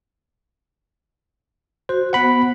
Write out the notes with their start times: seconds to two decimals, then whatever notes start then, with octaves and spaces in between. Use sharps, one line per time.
1.89 F#4 C5
2.13 B3 C5 F#5 B5